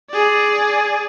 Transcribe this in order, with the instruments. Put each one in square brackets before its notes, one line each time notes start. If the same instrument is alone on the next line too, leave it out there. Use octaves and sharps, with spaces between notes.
[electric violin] G#4 D5